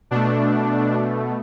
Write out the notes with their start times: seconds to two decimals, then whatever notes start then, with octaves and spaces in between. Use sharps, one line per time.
0.11 B2 A3 D4